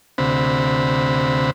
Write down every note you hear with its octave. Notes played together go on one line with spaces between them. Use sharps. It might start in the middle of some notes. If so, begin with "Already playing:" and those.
D2 C3 C4 B5